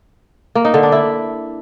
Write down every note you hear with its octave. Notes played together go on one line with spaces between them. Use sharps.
A#3
D#4
D3
D4
E4